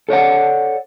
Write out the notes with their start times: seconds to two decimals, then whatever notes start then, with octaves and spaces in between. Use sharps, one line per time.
0.09 A4 C#5 D5 F#5